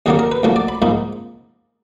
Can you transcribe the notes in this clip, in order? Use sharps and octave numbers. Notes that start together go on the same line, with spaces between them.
D#2 D3 F#3 A#3 D4 F#4
A#4
B4
D2 D3 F3 A#3 F#4
D5
B5
G#2 F3 A#3 B5